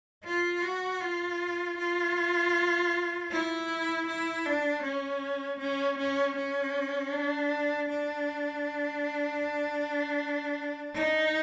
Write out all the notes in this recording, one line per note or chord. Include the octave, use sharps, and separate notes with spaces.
F4
F#4
F4
F4
E4
E4
D4
C#4
C#4
C#4
C#4
D4
D4
D#4